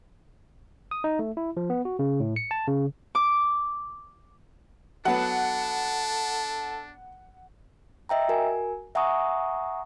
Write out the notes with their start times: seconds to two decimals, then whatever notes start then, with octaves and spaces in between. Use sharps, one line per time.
0.91 D#6
1.04 D#4
1.19 A3
1.37 E4
1.57 F3
1.70 B3
1.85 F#4
1.99 C#3
2.20 A2
2.36 C#7
2.51 A5
2.67 C#3
3.15 D6
5.05 F#3 B3 D4 A4 F#5
8.09 D#5 E5 G5 A#5
8.29 F#4 A#4 G#5
8.95 E5 F#5 G#5 A#5 C#6 D#6